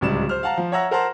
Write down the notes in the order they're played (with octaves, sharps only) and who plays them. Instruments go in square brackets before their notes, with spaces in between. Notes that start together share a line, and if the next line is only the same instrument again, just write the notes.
[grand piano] D1 C#2 G3 E7
C5 F6
F5 F#5 A5 A#5
F3
C#5 E5 F#5 A#5 E6 A#6
A#4 C5 F#5 A5 A#5 C6